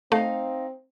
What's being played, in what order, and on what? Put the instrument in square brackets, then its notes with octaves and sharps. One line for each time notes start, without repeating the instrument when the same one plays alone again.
[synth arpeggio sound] A3 [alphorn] C4 [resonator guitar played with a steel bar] D#4 F5